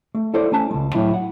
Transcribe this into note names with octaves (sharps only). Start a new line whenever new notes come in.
A3
E4 A4 C5 D5
A3 C#4 G#5 A5
C#2 G#3
A2 F#3 E4
F#5